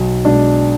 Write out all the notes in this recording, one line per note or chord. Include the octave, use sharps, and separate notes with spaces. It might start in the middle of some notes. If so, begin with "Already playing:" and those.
Already playing: B1
B2 G#3 D4